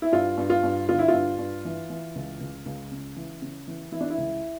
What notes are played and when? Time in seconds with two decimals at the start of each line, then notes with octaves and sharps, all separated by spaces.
0.02 E4
0.12 G2 F4
0.37 G2
0.50 F4
0.63 G2
0.89 D3 F4
0.99 E4
1.08 G2 F4
1.38 G2
1.65 E3
1.90 E3
2.15 C#2
2.40 C#2
2.66 C#2
2.91 C#3
3.16 E3
3.42 C#3
3.68 E3
3.92 E3 E4
4.01 D4
4.10 E4
4.18 C#2